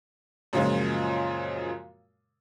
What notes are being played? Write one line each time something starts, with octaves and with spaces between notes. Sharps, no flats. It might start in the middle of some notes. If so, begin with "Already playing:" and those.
F#2 A#2 C#3 F3 G#3